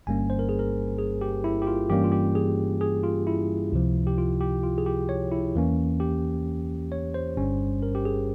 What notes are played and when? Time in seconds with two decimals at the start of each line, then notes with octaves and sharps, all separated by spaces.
0.07 G1 G2 G3 A#3 C#4 G#5
0.30 C5
0.39 A#4
0.49 G#4
0.59 A#4
0.98 G#4
1.21 G4
1.44 E4
1.62 G4
1.67 F4
1.90 G2 E3 G3 A#3 C#4 G4
2.04 F4
2.12 G4
2.35 G#4
2.81 G#4
3.04 F4
3.27 E4
3.72 C#2 C3 F3
4.07 G4
4.18 F4
4.41 G4
4.63 F4
4.78 G#4
4.86 G4
5.09 C#5
5.31 E4
5.55 E2 E3 A#3 C#4
6.00 G4
6.92 C#5
7.14 C5
7.37 G1 G2 G3 C#4
7.83 A#4
7.95 G4
8.05 G#4